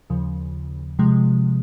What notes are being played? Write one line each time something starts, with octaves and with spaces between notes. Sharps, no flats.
D#2 C#3 F3
C3 F3 G#3